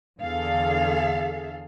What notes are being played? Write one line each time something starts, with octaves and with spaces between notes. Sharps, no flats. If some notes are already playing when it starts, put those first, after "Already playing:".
E2 D3 G#4 A4 F5